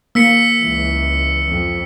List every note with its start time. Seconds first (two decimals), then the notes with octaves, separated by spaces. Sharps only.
0.15 A#3 E6 B6 C#7
0.57 C#2 E3
1.48 F2